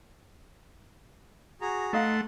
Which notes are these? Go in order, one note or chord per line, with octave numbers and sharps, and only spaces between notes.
F#4 G#4 A#5
A3 D#4 D#5 F5 F#5 C6